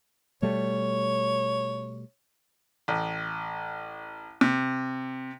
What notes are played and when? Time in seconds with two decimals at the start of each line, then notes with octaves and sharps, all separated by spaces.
0.42 B2 G3 A3 C#5
2.88 A1
4.41 C3